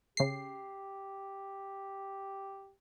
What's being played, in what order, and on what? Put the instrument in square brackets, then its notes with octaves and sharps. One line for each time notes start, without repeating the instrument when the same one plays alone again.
[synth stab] C#3 C7 [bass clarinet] G4